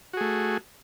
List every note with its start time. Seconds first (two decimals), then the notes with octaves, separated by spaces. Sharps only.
0.13 F#4
0.17 G#4
0.21 A3